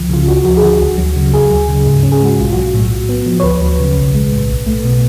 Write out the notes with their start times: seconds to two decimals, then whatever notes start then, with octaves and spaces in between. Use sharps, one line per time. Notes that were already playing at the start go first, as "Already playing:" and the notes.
Already playing: C#2 D3 F3
0.10 C#3 F4
0.28 D2 F#4
0.45 F3 F#4
0.57 G#4
0.62 D3 F#4
0.81 D2
0.98 F#3
1.16 C#3
1.33 D2 G#4
1.50 F#3
1.69 C#3
1.86 G#2
2.03 C#4
2.12 G#4
2.21 G#3 F#4
2.38 B1 F4
2.53 F#3 F#4
2.74 A2
2.91 A2
3.09 B3
3.26 F3
3.40 C#5
3.43 D2 B4
3.62 F#3
3.80 C#3
3.96 B1
4.14 G#3
4.31 A2
4.49 B1
4.66 A3
4.85 B2